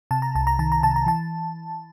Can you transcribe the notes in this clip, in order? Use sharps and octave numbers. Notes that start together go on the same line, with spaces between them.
C3 A5
A#5
C2 A5
A#5
D#3 A5
A#5
C3 A5
A#5
E3 A5